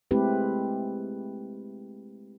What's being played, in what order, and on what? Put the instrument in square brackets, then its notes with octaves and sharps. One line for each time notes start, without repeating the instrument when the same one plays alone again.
[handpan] G#3 A3 C4 E4 G4 B4